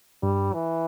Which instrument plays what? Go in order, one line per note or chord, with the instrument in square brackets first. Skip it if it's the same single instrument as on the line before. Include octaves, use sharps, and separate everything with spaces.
[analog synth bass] G2 [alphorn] G3
[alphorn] E3